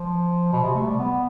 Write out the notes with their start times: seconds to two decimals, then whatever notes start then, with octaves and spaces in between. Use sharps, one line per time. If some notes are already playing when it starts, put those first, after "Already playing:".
Already playing: F3
0.53 B2
0.63 C3
0.75 A3
0.86 G3
0.99 B3